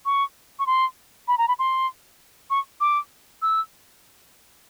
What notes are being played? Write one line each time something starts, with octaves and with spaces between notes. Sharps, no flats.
C#6
C#6
C6
B5
A#5
B5
C6
C#6
D6
E6